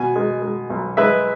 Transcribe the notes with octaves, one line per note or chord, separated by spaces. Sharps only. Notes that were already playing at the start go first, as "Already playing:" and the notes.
Already playing: B2 G#5
G#3
G#3
B1
G#3 B4 E5